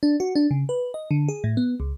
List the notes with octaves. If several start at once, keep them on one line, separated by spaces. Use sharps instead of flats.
D4
F#4
D4
C#3
B4
D#5
D3
G#4
A2
B3
C#2